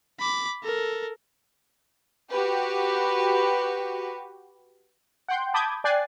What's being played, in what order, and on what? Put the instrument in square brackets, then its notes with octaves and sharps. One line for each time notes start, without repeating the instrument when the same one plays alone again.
[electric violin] B5 D6
A4 A#4
[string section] F#4 G4 B4
[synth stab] F#5 G5 C6 G6
A5 B5 D6 D#6 G6 G#6
D5 G5 G#5 F#6 A6 C7